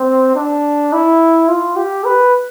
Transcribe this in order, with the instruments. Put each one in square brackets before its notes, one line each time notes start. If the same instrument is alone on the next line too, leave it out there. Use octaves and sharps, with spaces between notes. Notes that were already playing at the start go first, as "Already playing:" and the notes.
Already playing: [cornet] C4
D4
E4
F4
G4
B4